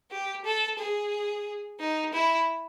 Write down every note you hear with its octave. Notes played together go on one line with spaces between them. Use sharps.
G4
A4
G#4
D#4
E4